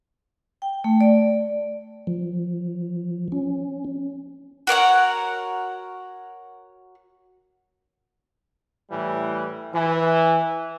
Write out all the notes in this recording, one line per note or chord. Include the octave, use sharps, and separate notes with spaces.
G5
A3
D5
F3
C#4
F#4 A#4 C#5 F#5
A2 E3 G3
E3